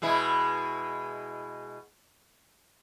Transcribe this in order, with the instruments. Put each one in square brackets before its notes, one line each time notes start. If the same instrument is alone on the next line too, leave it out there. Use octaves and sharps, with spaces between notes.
[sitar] B2 G#3 E4